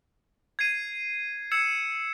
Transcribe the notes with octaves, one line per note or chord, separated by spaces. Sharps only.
G#6 C7 D#7
E6 G#6 C#7 E7